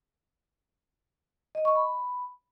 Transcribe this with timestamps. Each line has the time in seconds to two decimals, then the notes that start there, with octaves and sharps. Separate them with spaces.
1.55 D#5
1.65 C#6
1.75 B5